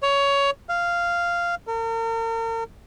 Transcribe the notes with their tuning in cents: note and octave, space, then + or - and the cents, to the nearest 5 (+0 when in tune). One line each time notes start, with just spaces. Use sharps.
C#5 +15
F5 -10
A#4 -40